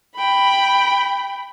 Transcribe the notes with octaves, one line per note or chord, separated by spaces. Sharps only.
G5 B5